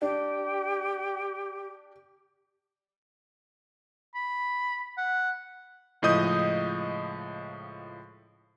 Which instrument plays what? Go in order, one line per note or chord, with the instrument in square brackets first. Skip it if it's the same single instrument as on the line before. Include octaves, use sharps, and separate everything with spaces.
[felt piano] D4 [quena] G4
[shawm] B5
F#5
[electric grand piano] C#2 A2 F3 D#5 D#6 G6